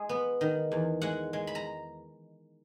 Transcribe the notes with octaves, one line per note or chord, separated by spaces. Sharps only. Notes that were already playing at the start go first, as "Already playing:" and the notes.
Already playing: G#3 G#4
B3
D#3
E2
G#3 F#5
G#3
B5
A#5